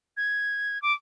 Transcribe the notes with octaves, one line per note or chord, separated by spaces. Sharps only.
G#6
D6